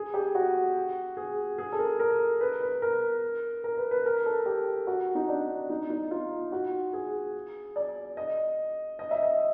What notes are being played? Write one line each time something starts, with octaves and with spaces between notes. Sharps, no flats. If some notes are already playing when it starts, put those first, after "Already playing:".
Already playing: G#4
G4
F#4
G#4
G#4
A4
A#4
A#4
B4
B4
A#4
A#4
B4
B4
A#4
A4
G4
F#4
D#4
D4
D#4
D#4
F4
F#4
G#4
D5
D#5
D#5
E5
D#5